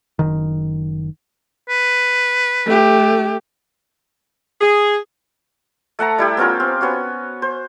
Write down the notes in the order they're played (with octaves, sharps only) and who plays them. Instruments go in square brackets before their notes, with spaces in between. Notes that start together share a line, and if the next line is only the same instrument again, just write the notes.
[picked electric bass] F#1 D#3
[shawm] B4
[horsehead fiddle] A3 G4
[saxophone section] G#4
[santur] A3 F#5 A5 A#5
G3 E4 G4
B3 C#4 F4 A#4
C4
B3 C#4 F#4
C5